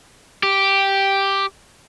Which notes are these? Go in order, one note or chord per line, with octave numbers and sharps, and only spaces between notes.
G4